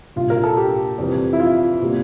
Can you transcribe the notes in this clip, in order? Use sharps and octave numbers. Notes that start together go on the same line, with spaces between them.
C2 A#2 G3 A#3 F4
A#4
A4
G4
F2 C3 E3 G3
E4
F4
C3 G3 A#3